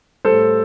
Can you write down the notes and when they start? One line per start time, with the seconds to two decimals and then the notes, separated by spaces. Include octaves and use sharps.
0.24 A2 G3 A4 C5